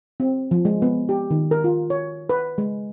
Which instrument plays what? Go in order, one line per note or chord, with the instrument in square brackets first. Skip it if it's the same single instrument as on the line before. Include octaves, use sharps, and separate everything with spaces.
[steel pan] C4
F3
G#3
B3
G4
D#3
A#4
F4
C#5
B4
G#3